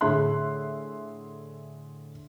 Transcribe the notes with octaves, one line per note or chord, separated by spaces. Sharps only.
A2 D3 G#4 E5 C6 F#6